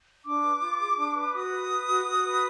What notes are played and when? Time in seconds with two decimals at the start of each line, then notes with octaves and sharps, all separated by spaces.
0.25 D4 D6
0.43 B4
0.61 F4
0.79 G#4
0.96 D4
1.15 B4
1.32 F#4 D#6
1.51 B4
1.69 B4
1.87 F#4
2.05 F#4
2.23 B4